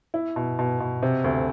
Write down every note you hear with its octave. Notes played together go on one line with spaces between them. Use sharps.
E4
B2
B2
B2
C3
D2